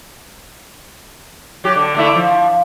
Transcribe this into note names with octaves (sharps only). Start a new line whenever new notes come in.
F#3 G4
D3
D3 A3 E4
F3